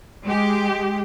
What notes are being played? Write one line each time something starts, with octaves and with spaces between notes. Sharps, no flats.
G#3 G4